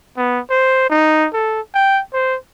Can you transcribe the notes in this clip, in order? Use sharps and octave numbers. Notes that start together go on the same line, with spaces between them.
B3
C5
D#4
A4
G5
C5